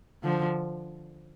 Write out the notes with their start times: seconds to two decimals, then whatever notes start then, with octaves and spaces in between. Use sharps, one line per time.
0.23 D3 F3